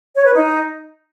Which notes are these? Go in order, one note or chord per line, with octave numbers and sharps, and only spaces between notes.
C#5
B4
D#4